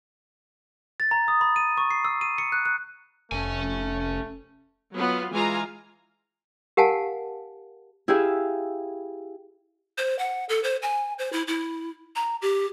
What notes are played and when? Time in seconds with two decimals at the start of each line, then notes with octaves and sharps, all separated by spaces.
1.00 A6
1.11 A#5
1.28 D#6
1.41 B5
1.56 D#7
1.77 C#6
1.91 C7
2.05 E6
2.21 D#7
2.38 C#7
2.52 F#6
2.66 F#6
3.32 F1 A3 C#4 G#5
4.94 F#3 B3 F4
5.33 E3 G#3 F4 F5 G#5 A#5
6.77 G4 A#4 F5 F#5 G#5 A5
8.08 E4 G4 G#4 E5 F5
9.98 C5
10.19 F#5
10.49 A4
10.63 C5
10.82 G#5
11.19 C5
11.33 E4
11.48 E4
12.16 A#5
12.42 G4